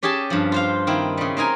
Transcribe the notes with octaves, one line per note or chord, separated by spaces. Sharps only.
C#4 G4 G#4 G#5 A5
G2 F3
F4 C5 F5
D#3 C4 E4
C#3 G3
C4 D#4 A#4 G#5